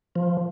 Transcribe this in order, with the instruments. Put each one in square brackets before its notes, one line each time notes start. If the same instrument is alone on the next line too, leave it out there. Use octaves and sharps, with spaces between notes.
[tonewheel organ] F3